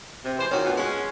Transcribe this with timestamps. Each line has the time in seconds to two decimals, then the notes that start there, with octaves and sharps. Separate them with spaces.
0.24 C3
0.39 E3 G#3 C5
0.51 A#2 D#3 C#4 F#4
0.64 D2 A#2 B3
0.77 G#3 C#4 F#5